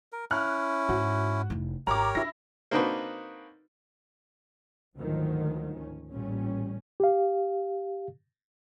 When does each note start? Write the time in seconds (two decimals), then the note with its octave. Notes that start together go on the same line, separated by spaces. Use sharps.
0.12 A#4
0.31 C#4 E4 F6 F#6
0.89 G#2 F#4
1.50 F1 E4
1.87 G#1 G4 A#4 C#5 A#5 D6
2.15 D4 E4 A#6
2.71 A#3 C4 D4 D#4 F#4 B4
4.97 D2 G#2 D#3 F3 F#3
5.77 C#4
6.12 A1 A#2 G3 C#4
7.00 G4 F5